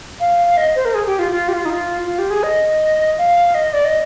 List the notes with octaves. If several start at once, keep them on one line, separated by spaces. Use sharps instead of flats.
F5
D#5
C5
A#4
G#4
G4
F4
F4
G4
F4
D#4
F4
F4
G4
G#4
D#5
F5
D#5
D5
D#5